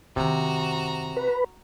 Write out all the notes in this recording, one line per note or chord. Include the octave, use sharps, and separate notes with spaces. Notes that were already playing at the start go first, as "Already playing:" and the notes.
F#2 C3 D#3 F#4 A#5
B4